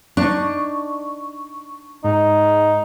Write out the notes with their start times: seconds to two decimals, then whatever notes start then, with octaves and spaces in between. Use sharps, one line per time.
0.17 D4 D#4 C#6
2.04 G#2 D#4